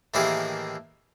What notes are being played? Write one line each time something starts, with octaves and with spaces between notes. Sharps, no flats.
A2 D#3 E3 A#3 G4 G#4